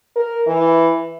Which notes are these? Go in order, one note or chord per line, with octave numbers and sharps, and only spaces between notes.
A#4
E3